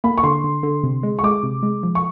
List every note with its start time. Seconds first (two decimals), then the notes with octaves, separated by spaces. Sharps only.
0.04 A#3 B5
0.18 C#6
0.23 D3 C6
0.44 D3
0.63 D3
0.83 C3
1.03 G#3
1.19 C#6
1.23 G#3 D6
1.43 C3
1.63 G#3
1.83 F3
1.95 C#6